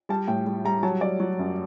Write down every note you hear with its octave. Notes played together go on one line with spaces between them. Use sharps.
G3 A5
A2 G5
G3
G3 A#5
F#3 A5
F#3 D5
F#3
F#2